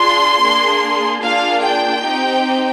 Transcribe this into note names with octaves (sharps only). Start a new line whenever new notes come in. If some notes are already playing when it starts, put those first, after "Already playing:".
Already playing: D4 F4 G#4 C6
A#3 D4 G#4
A#3 D4 F4 G#4 F5
G5
C4 D#4 G4